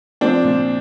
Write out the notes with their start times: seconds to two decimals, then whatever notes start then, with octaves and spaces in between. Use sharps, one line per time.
0.21 F3 C4 D4
0.44 A#2